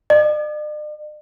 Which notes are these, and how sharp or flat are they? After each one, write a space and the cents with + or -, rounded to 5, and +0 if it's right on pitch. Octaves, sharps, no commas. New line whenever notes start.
D5 +45